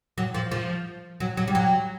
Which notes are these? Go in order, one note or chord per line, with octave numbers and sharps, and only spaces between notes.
F#3
F3
F3
F#3
F#3
G3
F#3